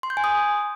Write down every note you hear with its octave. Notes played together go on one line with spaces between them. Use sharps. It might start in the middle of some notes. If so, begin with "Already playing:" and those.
C6
G6
G#5
D#6